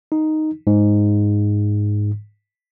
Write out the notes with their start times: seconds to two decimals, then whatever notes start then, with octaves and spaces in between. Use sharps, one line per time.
0.12 D#4
0.67 G#2